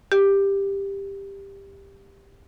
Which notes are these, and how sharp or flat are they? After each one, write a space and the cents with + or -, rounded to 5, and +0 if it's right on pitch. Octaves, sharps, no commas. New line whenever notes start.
G4 +10